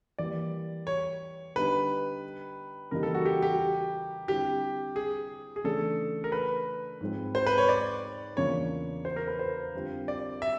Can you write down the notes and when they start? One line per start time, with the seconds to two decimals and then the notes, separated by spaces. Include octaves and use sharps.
0.19 E3 G3 A#3 D5
0.87 C#5
1.55 D3 G3 B3 D#4 B4
2.91 C#3 E3 G3 A#3 D#4 A#4
3.03 A4
3.14 F#4
3.25 G4
3.42 G4
4.28 D3 G3 C4 E4 G4
4.96 G#4
5.56 G#4
5.64 C#3 E3 A3 D4 A4
6.24 A#4
6.32 B4
7.01 G#2 F3 G#3 C4
7.35 C5
7.46 B4
7.58 C#5
7.69 D5
8.37 E2 C#3 F3 A#3 D4 C#5
9.05 C5
9.16 A#4
9.28 B4
9.39 C5
9.74 F2 D3 G3 C4 F4
10.08 D5
10.42 E5